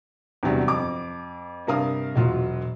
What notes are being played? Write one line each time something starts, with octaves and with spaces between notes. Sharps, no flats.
E2 G2 C3 F#3 G3
F2 D6
G2 C3 A#4 F5 D#6
E1 F#3 F4